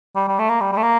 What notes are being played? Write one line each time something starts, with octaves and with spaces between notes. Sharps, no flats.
G3
G3
A3
A#3
G3
G3
A3
A#3